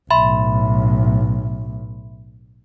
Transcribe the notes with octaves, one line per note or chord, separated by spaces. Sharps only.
B1 A2 E5 B5 C6